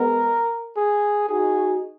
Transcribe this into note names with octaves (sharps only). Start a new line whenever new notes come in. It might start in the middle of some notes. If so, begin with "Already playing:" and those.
Already playing: G#3 B3 A#4
G#4
D#4 F#4 G#4